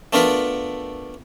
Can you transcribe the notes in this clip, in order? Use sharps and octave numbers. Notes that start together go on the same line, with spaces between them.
A3 B3 D4 F4 A#4 B4